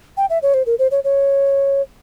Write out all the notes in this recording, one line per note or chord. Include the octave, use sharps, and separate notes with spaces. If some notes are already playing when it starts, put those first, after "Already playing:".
G5
E5
C#5
C5
A#4
C5
C#5
C#5